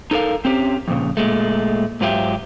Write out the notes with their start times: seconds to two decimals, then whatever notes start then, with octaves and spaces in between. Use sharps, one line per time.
0.11 D#4 A4 A#4 F5
0.45 C4 C#4 G4
0.88 F2 A#2 C#3
1.17 A#2 G#3 A3
2.01 G#2 F#3 F4 G4 E5